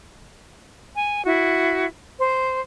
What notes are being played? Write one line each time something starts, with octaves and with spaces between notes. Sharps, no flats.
G#5
E4 F#4
C5